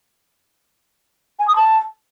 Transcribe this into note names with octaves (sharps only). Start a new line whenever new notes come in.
G#5
D#6
A5